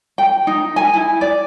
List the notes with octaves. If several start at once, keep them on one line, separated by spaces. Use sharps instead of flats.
G5
D#4
G#5
E4
D5